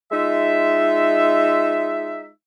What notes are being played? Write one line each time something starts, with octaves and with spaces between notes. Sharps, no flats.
G#3 D#4 F4 E5